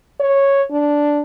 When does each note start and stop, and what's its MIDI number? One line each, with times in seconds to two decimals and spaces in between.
0.20 0.62 73
0.70 1.21 62